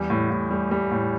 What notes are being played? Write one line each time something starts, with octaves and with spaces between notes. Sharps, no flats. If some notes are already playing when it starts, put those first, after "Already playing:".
Already playing: E2 G3
A2
A2
G3
G3
A2